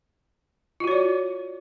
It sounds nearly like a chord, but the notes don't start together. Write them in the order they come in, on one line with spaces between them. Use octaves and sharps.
F4 F#4 C#5 D5